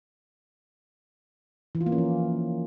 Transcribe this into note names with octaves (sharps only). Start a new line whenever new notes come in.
E3
F4
A#3
C#4
F3